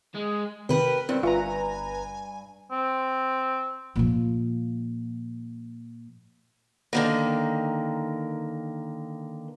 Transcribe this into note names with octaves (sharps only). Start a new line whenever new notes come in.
G#3
C3 D#3 G4 A#4 B4
G2 C4
G1 F4 B4 E5 G#5 A#5 C#6
C4
A#2 F3
D3 D#3 A#3